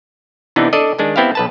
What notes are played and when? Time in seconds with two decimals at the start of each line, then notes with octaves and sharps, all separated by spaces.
0.56 C3 E3 B3 D4 D#4
0.73 D4 A4 D5 D#5
0.99 D#3 G#3 D4
1.16 B3 C4 E4 G4 F5
1.35 B1 B4 A5